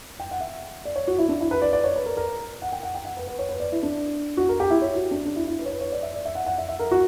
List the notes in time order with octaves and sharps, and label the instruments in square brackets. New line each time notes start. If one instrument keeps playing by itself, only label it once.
[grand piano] G5
F#5
E5
D5
C#5
F#4
E4
D4
E4
B4
D5
D5
C#5
B4
A#4
A#4
F#5
G5
F#5
G5
F#5
B4
B4
C#5
B4
D5
E4
D4
F#4
A#4
G4
E4
C#5
F#4
D4
D4
E4
E4
B4
C#5
B4
C#5
D5
E5
D5
E5
F#5
F#5
E5
E5
A#4
F#4